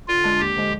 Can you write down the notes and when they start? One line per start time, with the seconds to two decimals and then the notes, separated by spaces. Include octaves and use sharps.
0.08 D3 F4
0.24 G#3 D4
0.40 D#2 G4
0.56 D3 F3 G#3